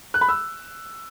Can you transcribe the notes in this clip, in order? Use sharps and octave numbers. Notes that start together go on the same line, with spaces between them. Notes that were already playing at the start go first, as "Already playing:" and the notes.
F#6
B5
E6